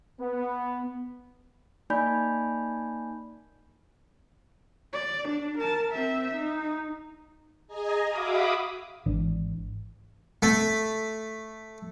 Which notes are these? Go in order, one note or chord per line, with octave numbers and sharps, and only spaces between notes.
B3
A#3 D#4 D5 G#5 B5 G6
D5
D4
A#4 A5
C4 E5
D#4
G#4 D#5 G#5 A#5
F#4 E5 F5 B5 D6 D#6
G#1 E3 D4
A3